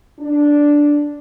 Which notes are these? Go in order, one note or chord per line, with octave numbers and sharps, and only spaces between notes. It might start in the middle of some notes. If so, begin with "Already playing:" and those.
D4